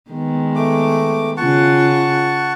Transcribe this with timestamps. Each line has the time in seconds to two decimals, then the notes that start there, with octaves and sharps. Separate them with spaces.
0.11 D#3 G#3 B3
0.56 A3 D6
1.37 C#3 F4 F#5 A5 C#6